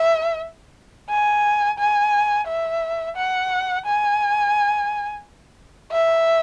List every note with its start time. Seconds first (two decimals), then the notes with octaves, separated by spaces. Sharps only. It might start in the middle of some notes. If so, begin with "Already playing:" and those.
Already playing: E5
1.09 G#5
1.79 G#5
2.47 E5
3.16 F#5
3.85 G#5
5.92 E5